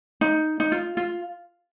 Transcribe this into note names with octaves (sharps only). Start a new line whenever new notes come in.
D#4
D#4
F4
F4